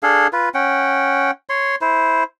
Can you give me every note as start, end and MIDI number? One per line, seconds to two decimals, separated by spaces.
0.03 0.27 62
0.03 0.27 68
0.03 0.27 69
0.03 0.27 77
0.33 0.49 65
0.33 0.49 71
0.54 1.31 61
0.54 1.31 78
0.54 1.31 79
1.49 1.76 73
1.49 1.76 84
1.81 2.23 64
1.81 2.23 72